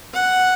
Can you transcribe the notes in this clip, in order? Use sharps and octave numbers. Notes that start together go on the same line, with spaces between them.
F#5